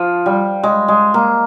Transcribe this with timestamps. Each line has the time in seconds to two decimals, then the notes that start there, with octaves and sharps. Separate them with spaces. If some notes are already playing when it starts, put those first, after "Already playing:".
Already playing: F3
0.26 G3
0.63 G#3
0.88 G#3
1.14 A#3